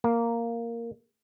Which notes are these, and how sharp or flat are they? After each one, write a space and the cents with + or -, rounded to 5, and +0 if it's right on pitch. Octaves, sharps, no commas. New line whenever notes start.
A#3 -5